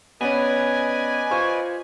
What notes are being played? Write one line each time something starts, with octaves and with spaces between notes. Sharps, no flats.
B3 C#4 B4 D5 D#5 G#5
F4 C5 C#6